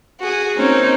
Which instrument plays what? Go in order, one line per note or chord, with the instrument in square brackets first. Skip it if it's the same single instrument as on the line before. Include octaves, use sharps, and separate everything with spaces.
[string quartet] F#4 G#4
A#3 C4 C#4 D#4 C5